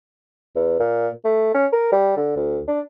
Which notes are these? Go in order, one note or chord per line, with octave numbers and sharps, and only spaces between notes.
E2
A#2
A3
C#4
A#4
G3
D3
D2
D4